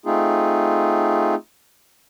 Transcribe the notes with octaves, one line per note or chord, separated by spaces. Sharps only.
A3 C4 D#4 F4 G#4